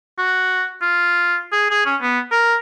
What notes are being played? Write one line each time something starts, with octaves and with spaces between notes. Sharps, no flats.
F#4
F4
G#4
G#4
C#4
B3
A#4